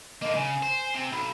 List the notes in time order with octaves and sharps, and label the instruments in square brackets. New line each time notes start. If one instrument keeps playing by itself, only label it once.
[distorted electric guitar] D3 A#3 [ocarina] D#5
[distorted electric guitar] C#3 [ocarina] G#5
[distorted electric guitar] C5
C3
[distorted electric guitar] B1 [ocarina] B5